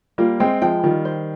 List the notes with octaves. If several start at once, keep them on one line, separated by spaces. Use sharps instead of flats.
G3 A#3 F4
G#3 C4 G5
F3 G#3 G5
D#3 G3 F4
C5